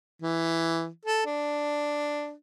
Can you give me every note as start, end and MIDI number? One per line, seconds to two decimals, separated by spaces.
0.22 0.87 52
1.06 1.22 69
1.26 2.32 62